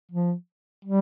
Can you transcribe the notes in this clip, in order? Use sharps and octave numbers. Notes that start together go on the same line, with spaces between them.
F3
G3